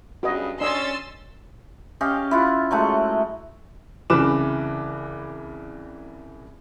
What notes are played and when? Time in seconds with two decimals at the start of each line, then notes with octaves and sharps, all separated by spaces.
0.23 G2 C#3 F#4 B4 D#5
0.61 C#4 D4 D#5 C6 E6 A6
2.01 C#4 G4 D#5 F5
2.31 E4 F4 F#5
2.71 F#3 G#3 A3 F#5
4.10 C2 C#3 E3 B4 D6 E7